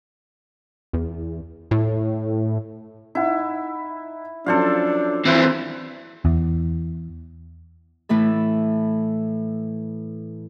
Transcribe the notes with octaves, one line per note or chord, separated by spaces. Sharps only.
E2
A2
D#4 E4 F#5
F3 F#3 C#4 D4 A4 C5 F5
E3 C4 E4 B4 C5
E2
A2 E3 A3 A4